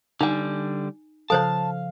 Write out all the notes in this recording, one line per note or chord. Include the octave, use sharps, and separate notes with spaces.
D3 G3 D#4 G#5
C#3 F3 A4 C5 C#5 F5 A5